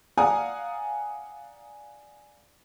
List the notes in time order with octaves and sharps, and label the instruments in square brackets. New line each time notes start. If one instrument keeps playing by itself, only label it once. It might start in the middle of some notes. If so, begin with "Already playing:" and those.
[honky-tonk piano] D5 F5 F#5 G#5 A#5 D#6